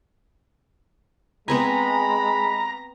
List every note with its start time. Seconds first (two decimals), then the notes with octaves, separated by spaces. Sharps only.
1.48 G#3 B3 C4 G#5 A#5 B5